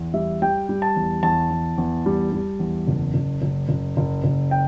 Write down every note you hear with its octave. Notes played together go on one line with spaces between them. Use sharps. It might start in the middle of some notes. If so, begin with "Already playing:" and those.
Already playing: E2
G3 E5
G3 G5
G3
A5
E2
E2 A5
E2
E2
G3
G3
E2
F#1
F#1
F#1
F#1
F#1
F#1
G5